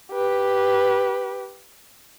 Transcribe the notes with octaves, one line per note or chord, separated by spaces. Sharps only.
G4 B4